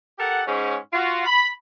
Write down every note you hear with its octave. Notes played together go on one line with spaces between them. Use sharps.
G4 A4 A#4 F#5
G#2 C#4
F4 F#4
B5